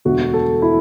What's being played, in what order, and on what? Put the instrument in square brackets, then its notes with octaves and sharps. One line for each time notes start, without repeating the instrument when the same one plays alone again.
[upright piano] E1 D2 D3 F#4
A4
E4